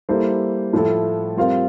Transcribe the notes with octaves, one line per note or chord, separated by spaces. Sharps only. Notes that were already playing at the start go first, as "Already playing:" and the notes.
G3 A#3 E4 A4 C5
A2 F3 A3 E4 A4
G3 C4 F4 A#4 F5